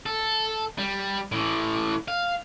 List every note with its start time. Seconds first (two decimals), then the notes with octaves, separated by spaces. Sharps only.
0.06 A4
0.78 G3
1.32 A2 E3
2.08 F5